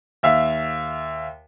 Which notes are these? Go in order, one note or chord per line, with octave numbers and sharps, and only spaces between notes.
D#2 E5 F5